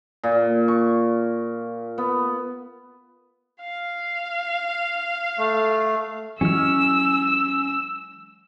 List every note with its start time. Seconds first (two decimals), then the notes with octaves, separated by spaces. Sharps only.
0.23 A#2
0.68 C#6
1.98 B3
3.61 F5
5.38 A3
6.41 E3 F#3 G#3 C#4 E6 F6